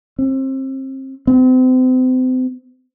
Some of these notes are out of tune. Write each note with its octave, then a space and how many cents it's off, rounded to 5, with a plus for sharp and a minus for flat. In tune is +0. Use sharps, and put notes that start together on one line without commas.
C4 +30
C4 -35